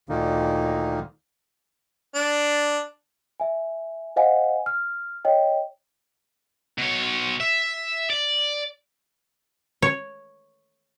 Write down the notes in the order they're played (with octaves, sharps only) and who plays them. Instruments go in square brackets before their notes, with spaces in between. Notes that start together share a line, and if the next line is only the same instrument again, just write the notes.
[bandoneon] D2 A#2 D3 D#3 A#3 D#4
[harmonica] D4
[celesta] E5 G#5
C5 D#5 F5 F#5 G#5
F6
C#5 D#5 G5
[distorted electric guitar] B2 C#5
E5
D5
[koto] C#5